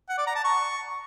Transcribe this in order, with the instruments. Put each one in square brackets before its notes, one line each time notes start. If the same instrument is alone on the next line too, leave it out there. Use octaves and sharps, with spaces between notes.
[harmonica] F#5
D5
A#5
A5
C#6